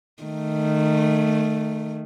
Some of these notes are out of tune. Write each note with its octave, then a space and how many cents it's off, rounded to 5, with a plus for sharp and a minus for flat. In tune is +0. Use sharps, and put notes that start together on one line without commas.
D#3 -20 A3 +0